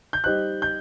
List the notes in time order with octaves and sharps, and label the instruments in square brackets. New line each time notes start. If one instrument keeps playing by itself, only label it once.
[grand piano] G6
[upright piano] G3 D#4 G4 C5 D#5 [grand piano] F#6
[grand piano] G6